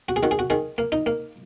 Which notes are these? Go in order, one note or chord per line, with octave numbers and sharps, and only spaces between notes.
F#4
G#4
D#3 F#4
G#4
F#4
D#3 G#4
A#3
D#4
A#3